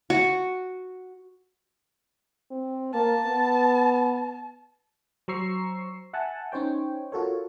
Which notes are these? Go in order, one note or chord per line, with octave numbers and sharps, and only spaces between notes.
F#4
C4
A#3 A5
B3
F#3 C5 A#5 C#6 E6 C7
E5 F#5 G#5 A5
C#4 D#4 C5 C#5 G5
F4 F#4 A4 A#4 C#5